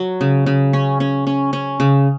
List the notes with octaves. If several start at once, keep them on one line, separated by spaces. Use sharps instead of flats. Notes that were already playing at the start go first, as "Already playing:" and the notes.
Already playing: F#3
C#3
C#3
C#4
C#4
C#4
C#4
C#3